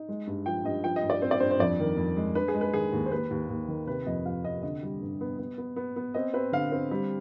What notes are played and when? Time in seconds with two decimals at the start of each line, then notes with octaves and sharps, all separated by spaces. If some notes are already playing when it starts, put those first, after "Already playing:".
Already playing: D#4
0.09 G#3
0.27 G2
0.46 F3 G5
0.65 G2 D#5
0.84 F3 G5
0.96 D#5
1.03 G2
1.10 D5
1.22 C4 C5
1.31 D5
1.40 G2 C5
1.51 C5
1.59 F2 D5
1.79 D#3
1.97 F2
2.17 G#3
2.35 D4 B4
2.48 G#4
2.54 G#3
2.61 B4
2.74 D#3 G#4
2.93 D#2
3.06 C5
3.11 D#2 B4
3.31 D#2
3.49 D#2
3.68 D#3
3.87 C3 B4
4.06 F2 D#5
4.26 F2 F5
4.44 C3 D#5
4.63 D3 D#5
4.83 G3
5.02 G2
5.21 B3
5.38 B3
5.58 B3
5.76 B3
5.96 B3
6.14 C4 D#5
6.34 C4 B4
6.52 D3 F5
6.72 C4
6.91 G3